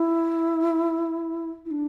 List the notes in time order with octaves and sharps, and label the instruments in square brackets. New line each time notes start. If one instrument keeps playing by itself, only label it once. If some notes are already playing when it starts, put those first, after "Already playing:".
Already playing: [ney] E4
E4
D4